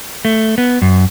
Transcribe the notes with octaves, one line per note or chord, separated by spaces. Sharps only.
A3
B3
F#2